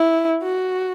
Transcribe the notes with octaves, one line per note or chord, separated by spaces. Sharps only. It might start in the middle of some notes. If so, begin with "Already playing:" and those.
Already playing: E4
F#4